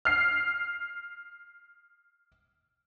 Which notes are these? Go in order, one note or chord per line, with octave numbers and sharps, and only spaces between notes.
F6 C7